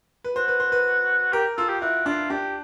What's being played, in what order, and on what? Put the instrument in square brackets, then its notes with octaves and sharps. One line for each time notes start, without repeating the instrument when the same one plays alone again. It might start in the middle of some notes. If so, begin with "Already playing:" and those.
[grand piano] B4
[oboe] F#4 [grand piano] C5
[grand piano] B4
C5
B4
[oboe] G4 [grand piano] A#4
[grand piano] F4 [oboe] A4
[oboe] G4
[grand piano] E4 [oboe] F#4
[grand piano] D4 [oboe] F4
[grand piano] D4 [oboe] G4